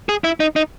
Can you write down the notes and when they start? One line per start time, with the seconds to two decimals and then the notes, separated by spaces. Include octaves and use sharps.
0.09 G#4
0.24 E4
0.40 D#4
0.56 D#4